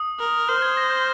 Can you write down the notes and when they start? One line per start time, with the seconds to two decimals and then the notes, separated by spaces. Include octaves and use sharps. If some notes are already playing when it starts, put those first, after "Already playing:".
Already playing: D#6
0.20 A#4
0.48 C5 F6
0.62 G#6
0.77 A#6
0.90 G6